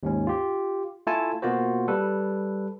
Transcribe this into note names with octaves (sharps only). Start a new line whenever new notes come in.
D#2 G#2 C#4
F4 G4
A3 E4 F4 A4 G#5 A5
B2 A#3 F4 F#4 C5
G3 A4 B4